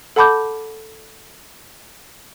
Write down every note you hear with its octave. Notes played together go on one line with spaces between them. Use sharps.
A4 F#5 A5 B5 D6 G6